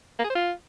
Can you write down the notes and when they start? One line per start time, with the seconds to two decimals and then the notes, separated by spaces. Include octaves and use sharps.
0.19 A#3
0.24 G#4
0.30 C5
0.35 F4